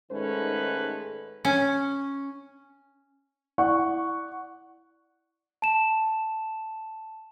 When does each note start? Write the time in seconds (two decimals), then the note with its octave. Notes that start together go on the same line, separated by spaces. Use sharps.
0.12 G#2 D#3 G#3 A3 C#4 B4
1.45 C#4
3.58 E4 D5 F#5 C#6
5.62 A5 E7